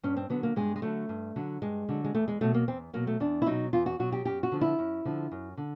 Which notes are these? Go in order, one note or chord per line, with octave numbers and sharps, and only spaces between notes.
G2 C#4
C4
D3 F#3 B3
A#3
G2 G#3
G#3
D3 F#3 A3
G2
D3 F#3
G2 G#3
D3 F#3
G#3
E2 A3
G#3
B2 F#3 A3
A#3
E2 C4
B2 F#3 A#3
A3
E2 D4
E4
B2 F#3 D#4
E2 F4
F#4
B2 F#3 F#4
G4
F#2 G4
F#4
D3 F3
E4
F#2
D3 F3
F#2
D3